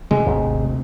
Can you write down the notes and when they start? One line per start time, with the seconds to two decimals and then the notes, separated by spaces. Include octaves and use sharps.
0.11 D2 C3 G#3 A3
0.26 G#1 D#2 G#2